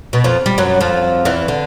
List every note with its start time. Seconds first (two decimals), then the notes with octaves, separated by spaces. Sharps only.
0.13 B2
0.24 F2 F3
0.46 G3
0.58 F#2 F#3
0.81 F2 F3
1.25 E2 E3
1.48 D3